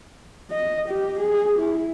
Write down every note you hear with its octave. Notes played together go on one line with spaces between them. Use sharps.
D#5
G4
G#4
E4